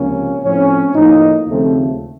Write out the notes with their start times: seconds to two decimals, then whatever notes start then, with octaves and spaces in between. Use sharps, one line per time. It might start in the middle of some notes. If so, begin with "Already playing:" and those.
Already playing: C#2 C3 F3 A#3 C#4
0.43 A2 F3 C4 C#4
0.94 A2 F3 A#3 D#4
1.46 D#2 C#3 F3 A3 C4